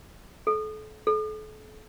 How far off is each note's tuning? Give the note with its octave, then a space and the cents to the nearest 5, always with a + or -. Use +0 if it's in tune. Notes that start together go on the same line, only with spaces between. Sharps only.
A4 -35
A4 -40